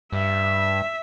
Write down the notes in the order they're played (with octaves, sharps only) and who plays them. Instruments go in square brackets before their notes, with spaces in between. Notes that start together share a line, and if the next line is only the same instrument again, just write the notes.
[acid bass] G2 [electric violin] E5